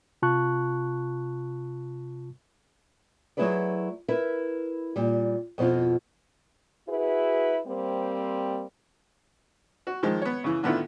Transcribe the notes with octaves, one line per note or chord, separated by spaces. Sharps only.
C3 F4 A5 C#6 F#6
F#3 A3 E4 G#4 B4 D5
E4 A#4 B4 E5
A#2 G3
F2 B2 C4 E4 F4
E4 F#4 G#4 B4
G3 A#3 C4
F#4
D#3 F3 G#3
B3 C#5
C#3 E3
A2 D3 D#3 B3 E4 F4